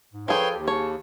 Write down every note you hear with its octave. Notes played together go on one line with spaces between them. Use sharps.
G#2
F3 G#4 A4 B4 C#5 G5 C6
D#2 G4
G#4 C#5 A5